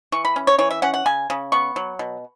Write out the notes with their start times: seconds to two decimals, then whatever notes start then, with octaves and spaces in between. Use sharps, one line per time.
0.12 E3 C#6
0.25 B5
0.36 C#4
0.47 C#5
0.58 E3 C#5
0.71 E5
0.82 C#4 F#5
0.94 F#5
1.06 C#3 G#5
1.30 C#3
1.52 B3 C#6
1.76 F#3
1.99 B2